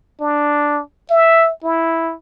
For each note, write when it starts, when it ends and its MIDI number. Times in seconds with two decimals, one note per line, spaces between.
0.21 0.82 62
1.10 1.51 76
1.63 2.14 64